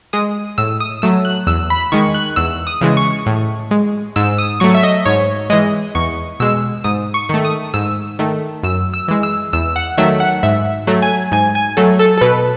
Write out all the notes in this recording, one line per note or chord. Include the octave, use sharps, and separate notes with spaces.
G#3 D#6
A2 E6
D#6
F#3 A3 E6
F#6
E2 E6
B5
D#3 G#3 C#6
F#6
E2 E6
D#6
C#3 E3 G#3
C#6
A2
G#3
G#2 E6
D#6
F#3 A3 C#6
E5
D#5
G#2 C#5
E3 G#3 D#5
E2 C#6
B2 G#3 E6
G#2 D#6
C#6
D#3 A3
D#6
G#2 E6
D#3 A3
F#2 E6
E6
E3 G#3
E6
E2 E6
F#5
D#3 F#3 A3 E5
F#5
G#2 E5
F#3 A3
G#5
G#2 G#5
G#5
F#3 A3 A4
A4
A4
B2 B4